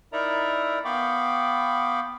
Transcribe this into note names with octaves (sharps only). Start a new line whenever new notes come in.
D#4 E4 A#4 D5 E5 A#5
B3 F5 G5 B5 C#6 D6